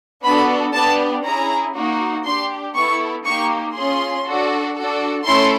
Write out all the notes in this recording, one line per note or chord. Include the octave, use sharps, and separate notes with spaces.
B3 D4 F#4 A4 B5
B3 D4 G4 A5
C#4 E4 G#4 A#5
A#3 D#4 F#4
D4 G4 C6
B3 E4 A4 C#6
A#3 D#4 G4 C#6
C#4 F4 G#4 C6
D4 F#4 A4
D4 F#4 A4
A3 C#4 E4 A4 C6